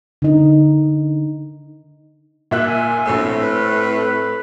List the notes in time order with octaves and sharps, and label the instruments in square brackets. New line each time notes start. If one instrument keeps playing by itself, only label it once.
[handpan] D3 D#4
[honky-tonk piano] A#2 E5 F#6
[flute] G#5
[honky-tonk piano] A#1 E6 [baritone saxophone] A2
[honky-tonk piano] C4 [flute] E5
[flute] B4